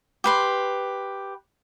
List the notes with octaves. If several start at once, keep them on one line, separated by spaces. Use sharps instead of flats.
G4 B4 C6